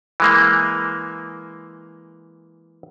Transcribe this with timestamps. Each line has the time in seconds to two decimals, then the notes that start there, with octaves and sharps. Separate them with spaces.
0.20 E3 G#3 A#3